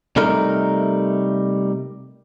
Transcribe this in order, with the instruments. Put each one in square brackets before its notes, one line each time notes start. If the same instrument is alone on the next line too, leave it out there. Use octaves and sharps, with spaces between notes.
[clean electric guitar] C3 G3 A3 D#4 A#4